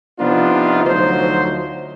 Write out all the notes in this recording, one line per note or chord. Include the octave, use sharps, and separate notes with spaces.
C3 F3 B3 D4 D#4 F4
D2 F3 F#3 D#4 C5